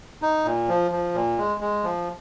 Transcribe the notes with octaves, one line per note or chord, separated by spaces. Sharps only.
D#4
A#2
F3
F3
A#2
G#3
G#3
F3